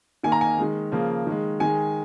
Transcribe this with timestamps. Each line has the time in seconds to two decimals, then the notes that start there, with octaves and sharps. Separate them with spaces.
0.23 D#3 A#3 G#5
0.32 A#5
0.41 G#5
0.58 D#3 G#3
0.92 C#3 F3 A#3
1.27 D#3 G#3
1.60 D#3 G#3 G#5